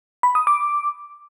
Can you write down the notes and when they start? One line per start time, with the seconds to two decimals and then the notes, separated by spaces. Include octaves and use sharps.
0.23 B5
0.35 D#6
0.47 D6